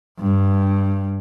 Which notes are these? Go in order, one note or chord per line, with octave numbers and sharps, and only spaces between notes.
G2